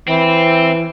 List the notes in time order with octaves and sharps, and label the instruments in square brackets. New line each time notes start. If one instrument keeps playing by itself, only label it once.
[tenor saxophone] E3 [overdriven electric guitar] C4